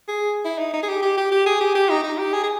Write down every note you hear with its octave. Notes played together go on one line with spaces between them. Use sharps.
G#4
E4
D#4
D#4
G#4
G4
G4
G4
G4
G#4
G4
G4
D#4
D#4
G4
G#4
G#4